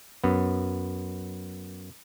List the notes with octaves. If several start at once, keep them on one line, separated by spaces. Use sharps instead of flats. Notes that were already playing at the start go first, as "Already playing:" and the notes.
F#2 B3